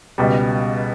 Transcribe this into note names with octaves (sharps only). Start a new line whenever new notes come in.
C#2 B2 G3